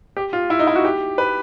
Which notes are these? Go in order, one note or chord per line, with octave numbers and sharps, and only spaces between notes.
G4
F4
E4
D#4
E4
F#4
G4
B4